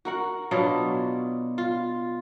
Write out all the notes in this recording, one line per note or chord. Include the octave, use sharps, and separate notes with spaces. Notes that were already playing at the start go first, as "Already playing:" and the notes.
F#4 A#4 F#5
B2 F#3 D4 F4
F4